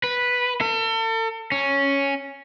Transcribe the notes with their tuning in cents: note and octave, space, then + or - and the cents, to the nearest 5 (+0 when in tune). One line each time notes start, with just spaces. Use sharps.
B4 -5
A4 +40
C#4 +0